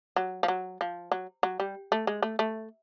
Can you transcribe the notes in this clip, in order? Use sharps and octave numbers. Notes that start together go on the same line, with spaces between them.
F#3
F3
F#3
F3
F#3
F#3
G3
A3
G#3
A3
A3